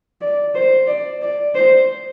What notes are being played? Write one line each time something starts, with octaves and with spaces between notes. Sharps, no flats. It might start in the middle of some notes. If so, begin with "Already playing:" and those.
D5
C5
D5
D5
C5